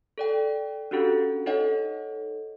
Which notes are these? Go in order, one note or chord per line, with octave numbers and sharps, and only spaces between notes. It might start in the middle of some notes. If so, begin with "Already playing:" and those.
A4 D5 G5
C#4 D4 F#4 G4 A4
D#4 A4 C#5 D#5 F#5